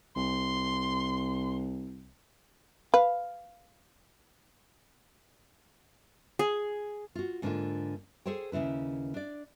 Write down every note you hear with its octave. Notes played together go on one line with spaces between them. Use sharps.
C2 C6
B4 F5
G#4
F4 F#4
G#2 D3 A#3 B3 D4 F4
G#4 A4 C5 C#5 G5
D#2 C#3 A3 E4 B4
D4 D5